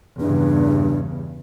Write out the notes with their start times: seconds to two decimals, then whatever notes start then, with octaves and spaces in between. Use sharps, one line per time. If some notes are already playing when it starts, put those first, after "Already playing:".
0.20 E2 G2 C#3 D4